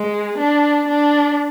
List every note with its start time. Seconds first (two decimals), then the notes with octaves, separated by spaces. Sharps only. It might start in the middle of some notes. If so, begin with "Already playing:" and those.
Already playing: G#3
0.38 D4
0.88 D4